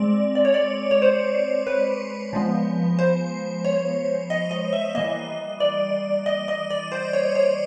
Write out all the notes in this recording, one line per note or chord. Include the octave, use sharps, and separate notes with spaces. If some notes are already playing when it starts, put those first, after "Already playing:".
Already playing: G#3 C4 D5
D5
C#5
D5
C#5
C5
B4
F3 G#3 B3
C5
C#5
D#5
D#5
E5
E3 G3 A#3 D#5
D5
D#5
D#5
D5
C5
C#5
C#5